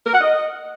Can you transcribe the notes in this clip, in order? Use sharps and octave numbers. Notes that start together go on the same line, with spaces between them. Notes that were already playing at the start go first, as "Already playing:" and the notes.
A#4
F#5
D#5